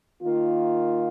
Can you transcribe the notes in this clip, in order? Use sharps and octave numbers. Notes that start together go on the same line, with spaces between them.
D#3 A#3 F4